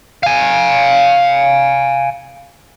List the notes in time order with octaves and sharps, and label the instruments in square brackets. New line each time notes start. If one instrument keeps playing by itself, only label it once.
[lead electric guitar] F5 G#5